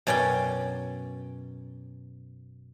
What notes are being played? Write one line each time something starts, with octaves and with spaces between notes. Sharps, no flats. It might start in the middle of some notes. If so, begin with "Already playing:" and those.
F#2 B2 C#4 D5 G5